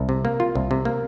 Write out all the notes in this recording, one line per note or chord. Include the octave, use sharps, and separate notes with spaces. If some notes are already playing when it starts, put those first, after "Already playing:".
Already playing: C2
C3
A#3
F4
C2
C3
A#3